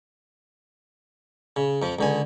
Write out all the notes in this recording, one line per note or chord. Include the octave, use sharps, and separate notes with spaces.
C#3
F2 F3
C#2 D3 G#5